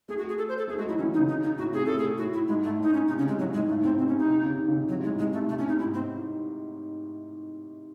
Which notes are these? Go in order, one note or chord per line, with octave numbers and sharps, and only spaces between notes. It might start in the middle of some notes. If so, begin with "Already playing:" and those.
A3 G#4
F#4
G#4
A4
C5
A4
A3 G#4
G#3 F#4
F#3 E4
E3 C#4
D#3
D#4
C#3
D#4
D#4
A2 F#4
C3 G#4
A2 A4
G#4
A2 F#4
E4
G#2 G#3
A3
A2 D#4
C#4
C3 D#4
C#3 C#4
G#3
A2 F#3
G#2 G#3
A2 A3
G#2
A2 C4
C3 C4
C#4
D#4
C3
C#3
D#3
C#3
C3
A2 F#3
G#2 G#3
A2
C3 G#3
A3
C3 A3
A2 C#4
G#2 D#4
G#2 E4
C4